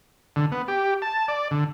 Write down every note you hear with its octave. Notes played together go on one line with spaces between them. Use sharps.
D3
B3
G4
A5
D5
D3